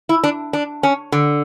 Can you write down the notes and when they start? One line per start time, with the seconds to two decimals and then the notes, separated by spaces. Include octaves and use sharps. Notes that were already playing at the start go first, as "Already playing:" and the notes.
0.09 E4
0.24 D4
0.53 D4
0.83 C#4
1.12 D3